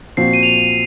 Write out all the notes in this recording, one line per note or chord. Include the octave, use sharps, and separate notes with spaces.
A#2 F3 C4 F#4 C7
D#7
F7
D#7
D#7